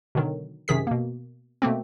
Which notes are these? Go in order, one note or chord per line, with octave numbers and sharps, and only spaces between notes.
B2 D3 D#3 F#3
F#2 C3 D#3 G#4 B6
B2 A#3
B2 A3 A#3 C4